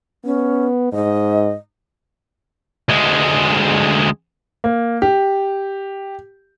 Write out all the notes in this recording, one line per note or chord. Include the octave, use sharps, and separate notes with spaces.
B3 C#4
G#2 D#5
D2 G#3
A#3
G4